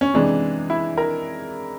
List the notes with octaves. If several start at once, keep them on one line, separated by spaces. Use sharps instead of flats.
C#4
C3 E3 G#3 D4
E4
A#4